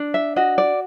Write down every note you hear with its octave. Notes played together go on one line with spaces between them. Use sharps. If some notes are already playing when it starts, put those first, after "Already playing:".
Already playing: D4
E5
F#4 D#5
D5